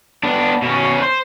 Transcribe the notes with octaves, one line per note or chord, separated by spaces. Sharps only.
B3 D4
B2 C#4
B4 C5